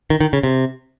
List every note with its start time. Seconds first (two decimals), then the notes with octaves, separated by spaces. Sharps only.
0.10 D#3
0.20 D#3
0.33 C#3
0.43 C3